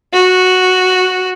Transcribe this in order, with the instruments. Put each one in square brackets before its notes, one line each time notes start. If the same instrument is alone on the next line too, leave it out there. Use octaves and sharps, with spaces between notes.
[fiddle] F#4